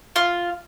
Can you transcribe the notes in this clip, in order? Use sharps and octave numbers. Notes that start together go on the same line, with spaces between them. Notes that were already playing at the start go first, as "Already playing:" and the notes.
F4